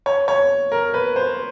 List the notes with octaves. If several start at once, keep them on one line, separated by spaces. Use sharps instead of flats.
C#5
C#5
A#4
B4
C5